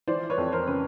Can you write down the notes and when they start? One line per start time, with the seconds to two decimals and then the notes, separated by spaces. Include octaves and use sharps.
0.08 E3 C5 D5
0.30 B4 C#5
0.38 F2
0.52 A#4 C5
0.67 C#3 B4